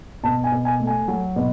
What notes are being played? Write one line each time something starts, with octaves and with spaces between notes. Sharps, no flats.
B2 A5
G#5
B2
G#5
A3
G#5
F#3
B2